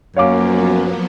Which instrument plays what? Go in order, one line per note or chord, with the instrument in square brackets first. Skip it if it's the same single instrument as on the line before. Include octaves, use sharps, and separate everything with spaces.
[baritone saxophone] F#2 [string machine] F3 F#3 B3 [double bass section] A#3 [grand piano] C#5 F5 D6